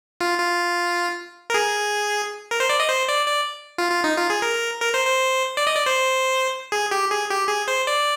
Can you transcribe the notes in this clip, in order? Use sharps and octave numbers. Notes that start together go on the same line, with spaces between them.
F4
F4
A#4
G#4
A#4
C5
D5
D#5
C5
D5
D5
F4
F4
D#4
F4
G#4
A#4
A#4
C5
C5
D5
D#5
D5
C5
G#4
G4
G#4
G4
G#4
C5
D5